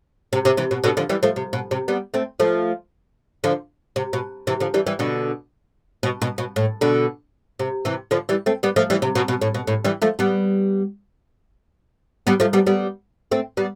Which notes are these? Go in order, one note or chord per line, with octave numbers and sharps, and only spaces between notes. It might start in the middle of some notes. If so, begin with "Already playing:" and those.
C3
C3
C3 E3
B2
B2 D3
D3 F3
E3 G3
F3 A3
C3
B2
C3
G3 B3
A3 C4
F3 A3
D3 F3
C3
B2
C3 E3
D3 F3
E3 G3
E3 G3
B2 D3
B2
B2
B2
A2
B2 D3
C3
C3 E3
D3 F3
E3 G3
A3 C4
G3 B3
F3 A3
E3 G3
C3
B2
B2
A2
B2
A2
E3 G3
F3 A3
G3 B3
G3 B3
F3 A3
G3 B3
G3 B3
A3 C4
G3 B3